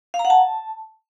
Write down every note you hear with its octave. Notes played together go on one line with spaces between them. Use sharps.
F5
A#5
F#5
A5